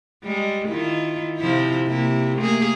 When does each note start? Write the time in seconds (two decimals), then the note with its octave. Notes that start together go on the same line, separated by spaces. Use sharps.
0.23 G3 G#3
0.68 D#3 E4 F4
1.38 C3 F3 E4
1.87 C3 A#3 E4
2.37 A3 A#3 G#4